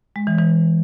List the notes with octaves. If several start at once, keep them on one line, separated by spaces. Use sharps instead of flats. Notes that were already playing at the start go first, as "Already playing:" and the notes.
G#3
E3
E3